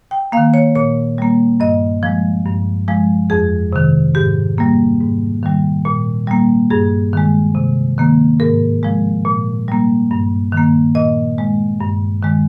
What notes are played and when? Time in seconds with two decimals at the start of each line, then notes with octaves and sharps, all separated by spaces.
0.11 G5
0.32 A#3 F5
0.37 D#3
0.54 C#5
0.75 A#2 C#5
1.18 G3 A#3
1.60 G2 D#5
2.03 F3 G#3
2.46 G2
2.88 F3 G#3
3.30 F2 G#4
3.73 C3 D#3
4.15 G#2 G4
4.58 G3 A#3
5.01 G#2
5.43 D#3 G3
5.85 A#2
6.27 G3 A#3
6.70 G2 G#4
7.13 D#3 G#3
7.55 C3
7.98 D#3 A#3
8.40 G#2 A#4
8.83 F3 G#3
9.25 A#2
9.68 G3 A#3
10.11 G2
10.52 D#3 A#3
10.95 A#2 D#5
11.38 G#3
11.80 G2
12.23 D#3 G#3